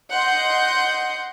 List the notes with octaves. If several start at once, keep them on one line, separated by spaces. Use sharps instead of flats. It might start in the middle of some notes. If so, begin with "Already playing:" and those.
D#5 F#5 C6 G6